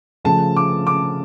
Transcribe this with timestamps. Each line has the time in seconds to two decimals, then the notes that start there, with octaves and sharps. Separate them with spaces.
0.24 C#3 F3 A3 A5
0.56 D6
0.87 D6